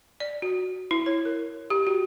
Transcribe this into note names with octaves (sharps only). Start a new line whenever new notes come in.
D5
F#4
E4
C#5
A#4
G4
F#4